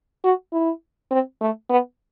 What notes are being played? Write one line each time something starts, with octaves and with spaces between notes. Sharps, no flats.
F#4
E4
C4
A3
B3